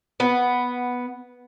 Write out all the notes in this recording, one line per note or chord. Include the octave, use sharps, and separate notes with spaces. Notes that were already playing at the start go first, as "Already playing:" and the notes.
B3